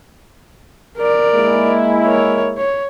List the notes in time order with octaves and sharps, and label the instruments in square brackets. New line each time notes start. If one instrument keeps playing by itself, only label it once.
[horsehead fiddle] A#4 D5
[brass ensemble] G#3 A#3 E4
[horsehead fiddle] A#4 C#5
C#5